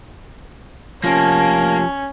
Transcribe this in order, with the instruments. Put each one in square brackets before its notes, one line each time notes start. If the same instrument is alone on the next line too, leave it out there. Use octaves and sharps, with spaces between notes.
[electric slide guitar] F3 F4 G4 [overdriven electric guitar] A#3 [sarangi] C#4 [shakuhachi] A5